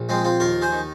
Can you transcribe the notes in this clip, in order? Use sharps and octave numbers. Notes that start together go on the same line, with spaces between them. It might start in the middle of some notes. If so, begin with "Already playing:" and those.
Already playing: A#1
F3 G#3 C4
C4 F4
D#2 F4 A#4
G#4 C5
D#3